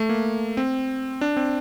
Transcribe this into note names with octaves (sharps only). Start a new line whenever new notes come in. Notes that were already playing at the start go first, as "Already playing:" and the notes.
Already playing: A3
A#3
C4
D4
C4